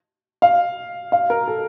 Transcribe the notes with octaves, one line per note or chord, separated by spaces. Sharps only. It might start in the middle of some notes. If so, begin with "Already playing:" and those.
F5
F5
A#4
A4